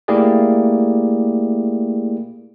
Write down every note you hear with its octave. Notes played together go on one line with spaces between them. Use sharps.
A3 A#3 E4 G4 G#4 D5